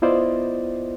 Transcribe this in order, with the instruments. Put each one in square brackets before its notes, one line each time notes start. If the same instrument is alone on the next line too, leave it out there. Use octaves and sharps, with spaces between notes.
[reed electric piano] B3 E4 F4 C5 D5 D#5